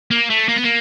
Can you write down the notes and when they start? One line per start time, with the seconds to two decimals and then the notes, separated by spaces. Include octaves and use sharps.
0.11 A#3
0.30 A3
0.48 A#3
0.56 B3
0.64 A#3